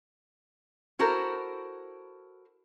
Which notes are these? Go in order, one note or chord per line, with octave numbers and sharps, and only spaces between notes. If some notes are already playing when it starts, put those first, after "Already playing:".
E4 F#4 A4 A#4 C5